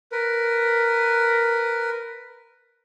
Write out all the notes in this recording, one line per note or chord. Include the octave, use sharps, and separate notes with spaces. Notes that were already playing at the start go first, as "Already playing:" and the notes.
A#4 B4